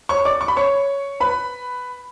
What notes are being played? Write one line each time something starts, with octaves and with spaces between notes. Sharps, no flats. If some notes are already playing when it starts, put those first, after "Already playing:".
C#5 C#6
D5 D6
C#6
B5
C#5 C#6
B4 B5